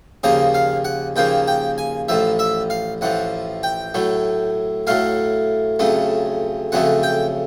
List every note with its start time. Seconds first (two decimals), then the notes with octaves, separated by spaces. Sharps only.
0.24 D#2 C#3 F3 A#3 D#5
0.54 F5
0.85 F#5
1.16 D#2 C#3 F3 A#3 G5
1.47 G5
1.78 G#5
2.09 A1 A2 F3 E5
2.39 E5
2.70 F5
3.01 A1 A2 F3 F#5
3.63 G5
3.94 A2 F#3 A3
4.87 A2 F#3 A3 F5
5.79 F2 C#3 F#3 A3
6.72 F2 C#3 F#3 A3 F#5
7.03 G5